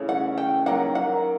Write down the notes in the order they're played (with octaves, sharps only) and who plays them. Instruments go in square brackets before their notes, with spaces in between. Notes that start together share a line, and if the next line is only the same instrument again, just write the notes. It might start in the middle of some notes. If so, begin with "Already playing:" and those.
Already playing: [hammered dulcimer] C#3 E3 A3 C#4
[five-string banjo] F#5
G5
[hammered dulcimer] D#3 F#3 A#3 [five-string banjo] F#5
[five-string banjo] F#5